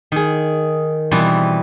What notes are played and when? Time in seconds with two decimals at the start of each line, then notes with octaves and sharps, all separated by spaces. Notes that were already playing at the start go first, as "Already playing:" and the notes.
0.12 D#3 G#4
1.11 B2 E3 G3 C4